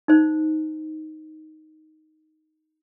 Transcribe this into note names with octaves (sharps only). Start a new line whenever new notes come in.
D#4 C5